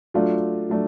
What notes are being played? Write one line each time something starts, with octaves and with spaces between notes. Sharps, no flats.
F#3 A3 D4 F4
F#3 A3 D4